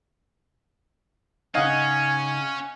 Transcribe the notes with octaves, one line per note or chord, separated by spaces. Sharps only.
C#3 C#4 D#4 D#5 F5 F#5 G#5